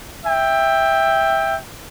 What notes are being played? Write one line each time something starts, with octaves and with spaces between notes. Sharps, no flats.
E5 G5